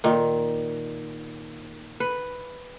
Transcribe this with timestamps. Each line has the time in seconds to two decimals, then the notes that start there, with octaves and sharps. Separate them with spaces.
0.04 A#2 D#3
2.00 B4